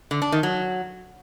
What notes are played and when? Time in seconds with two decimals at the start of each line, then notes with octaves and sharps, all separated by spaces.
0.11 D3
0.22 D4
0.32 D#3
0.43 F#3